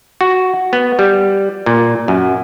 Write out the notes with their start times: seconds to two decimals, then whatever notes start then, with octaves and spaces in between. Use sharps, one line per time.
0.21 F#4
0.73 B3
0.99 G3
1.66 A#2
2.08 F#2